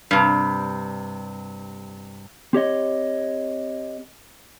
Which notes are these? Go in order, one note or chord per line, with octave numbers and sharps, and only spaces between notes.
G2 C3
C4 G4 C#5 D#5